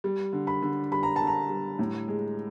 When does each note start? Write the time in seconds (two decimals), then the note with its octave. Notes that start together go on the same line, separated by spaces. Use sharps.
0.04 G3
0.33 D3
0.47 B5
0.62 D3
0.92 G3 B5
1.03 A#5
1.16 A5
1.21 D3
1.27 A#5
1.49 G3
1.79 A2
2.08 G#3